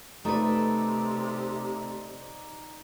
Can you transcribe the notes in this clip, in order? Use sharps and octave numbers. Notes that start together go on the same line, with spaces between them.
C3 A3 D#4 B4 D5